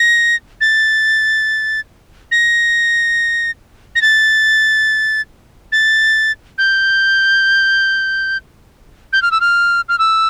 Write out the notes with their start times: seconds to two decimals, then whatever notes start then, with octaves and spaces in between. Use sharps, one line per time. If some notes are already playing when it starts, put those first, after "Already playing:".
Already playing: A#6
0.61 A6
2.31 A#6
3.95 A#6
4.02 A6
5.72 A6
6.58 G6
9.13 G6
9.22 F6
9.31 E6
9.40 F6
9.89 F6
9.99 E6